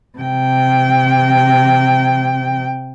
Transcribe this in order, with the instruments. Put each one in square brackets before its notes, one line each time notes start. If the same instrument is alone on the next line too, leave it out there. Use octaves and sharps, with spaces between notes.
[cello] C3 G5